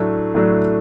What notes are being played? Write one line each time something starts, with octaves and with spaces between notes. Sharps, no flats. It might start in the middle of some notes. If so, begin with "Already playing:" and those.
Already playing: A2 F#3 A3 D4
A2 F#3 A3 D4